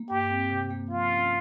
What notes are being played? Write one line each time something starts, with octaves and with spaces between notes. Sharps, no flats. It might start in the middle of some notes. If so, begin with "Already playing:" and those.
Already playing: A#3
G2 G4
C4
C3
A#3
F3 F4
C#4